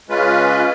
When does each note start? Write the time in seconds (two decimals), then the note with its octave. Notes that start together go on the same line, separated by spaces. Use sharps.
0.09 C#3 G#3 C#4 F4 B4